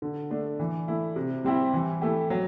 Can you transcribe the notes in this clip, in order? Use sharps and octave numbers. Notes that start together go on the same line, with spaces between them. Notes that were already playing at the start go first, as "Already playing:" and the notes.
D3
A3 D4
E3
A3 E4
C3
G3 C4 E4 G4
E3
A3 E4 G4
F#3